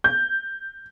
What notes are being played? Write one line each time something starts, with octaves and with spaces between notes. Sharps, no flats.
G6